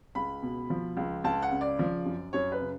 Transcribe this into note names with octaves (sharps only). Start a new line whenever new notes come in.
C#2 B5
B2
F3
C#2
C#2 A5
F#5
C#3
D5
F3
F#2
F#2 C#5
B4
C#3